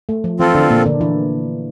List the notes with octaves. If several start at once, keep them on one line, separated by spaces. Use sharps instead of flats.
A3
F3
E3 C4 F4 A4
D3 D4
A#2 A#3
D3 D4
E3 E4